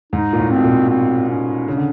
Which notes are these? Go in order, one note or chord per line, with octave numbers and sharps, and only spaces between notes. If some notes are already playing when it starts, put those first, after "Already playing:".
G#2 D#4
A#2
A2
C4
B2
A#2
C4
C#4
C#3 D4
D3